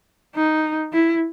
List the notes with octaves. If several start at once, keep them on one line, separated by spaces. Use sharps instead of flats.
D#4
E4